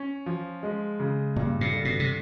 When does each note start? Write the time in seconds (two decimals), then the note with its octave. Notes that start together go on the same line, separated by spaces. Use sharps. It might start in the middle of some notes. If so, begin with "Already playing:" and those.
Already playing: C#4
0.26 F3
0.63 G#3
1.00 C#3
1.36 G2 A#2
1.61 A#2
1.72 D3
1.85 B2
2.00 C3